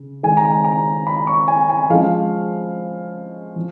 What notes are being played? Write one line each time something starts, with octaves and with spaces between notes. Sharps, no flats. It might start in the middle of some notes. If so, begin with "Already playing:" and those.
Already playing: C#3
D#3 G#3 D#4 G#5
A#5
G#5
A#5
B5
C#6
G#5
G#5
F3 G#3 C#4 F5
F3